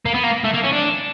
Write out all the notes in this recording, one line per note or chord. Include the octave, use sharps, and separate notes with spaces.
A#3
B3
A#3
A3
A#3
C#4
D4